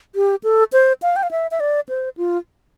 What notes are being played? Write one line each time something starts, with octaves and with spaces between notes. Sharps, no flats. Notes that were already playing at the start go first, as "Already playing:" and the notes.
G4
A4
C5
F5
G5
F5
E5
E5
D5
C5
F4